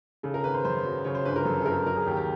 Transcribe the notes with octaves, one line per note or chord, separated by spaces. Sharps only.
C#3 A4
A#4
G#1 B4
C5
F#2 C5
F#3
C#3 C#5
C5
G1 B4
A#4
F#2 A4
A4
G1 A#4
F#3 A#4
G#4
D#2 G4
G4